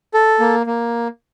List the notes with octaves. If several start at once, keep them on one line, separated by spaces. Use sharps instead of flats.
A4
A#3
A#3